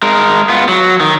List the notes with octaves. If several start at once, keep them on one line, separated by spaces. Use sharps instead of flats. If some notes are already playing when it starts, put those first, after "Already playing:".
G#3 A#4
B3 F4
F#3
D#3